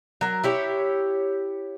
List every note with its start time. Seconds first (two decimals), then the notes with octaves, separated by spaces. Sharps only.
0.21 F#3 A#4
0.44 E4 G4 C#5